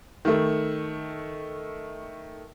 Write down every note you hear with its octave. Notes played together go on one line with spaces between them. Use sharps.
D#3 A3